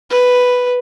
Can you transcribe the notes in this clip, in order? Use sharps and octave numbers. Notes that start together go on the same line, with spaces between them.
B4